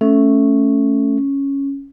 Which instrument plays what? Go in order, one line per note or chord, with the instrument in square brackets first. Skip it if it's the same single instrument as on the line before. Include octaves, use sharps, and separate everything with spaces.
[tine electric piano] A3 [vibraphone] C#4